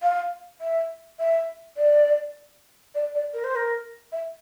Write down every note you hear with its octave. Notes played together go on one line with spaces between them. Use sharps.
F5
E5
E5
D5
D5
D5
A#4
C5
A#4
E5